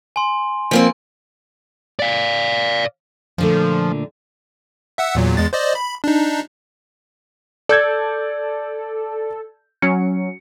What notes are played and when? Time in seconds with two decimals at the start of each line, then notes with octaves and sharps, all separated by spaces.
0.16 G#5 C6
0.71 F3 A#3 C4 G#5
1.99 D5 F5
3.38 A#2 D3 F3 A3
4.98 E5 F#5 E6
5.15 E2 A#2 F#3
5.37 E2 G#3 A6
5.53 C5 D5 D#5
5.75 B5
6.04 D4 D#4
7.69 A4 D5 G6 G#6
9.82 F#3 C#4 C#7